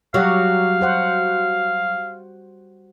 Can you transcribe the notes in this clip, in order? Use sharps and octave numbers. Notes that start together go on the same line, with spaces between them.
F#3 G3 G4 F5 F#5
F#4 C5 F#5